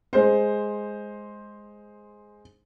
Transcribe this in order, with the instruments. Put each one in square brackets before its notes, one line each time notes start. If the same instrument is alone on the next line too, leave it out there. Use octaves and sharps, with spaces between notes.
[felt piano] G#3 C5